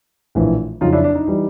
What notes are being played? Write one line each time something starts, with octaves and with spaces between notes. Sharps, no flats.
A#1 A2 E3
F2 C#3 F#3 D#4 F4
D4 E4
D4
D#4
E3 G3